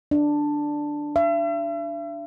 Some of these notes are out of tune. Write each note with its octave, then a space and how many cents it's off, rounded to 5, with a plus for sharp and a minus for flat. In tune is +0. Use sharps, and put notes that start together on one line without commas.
D4 +5
E5 +40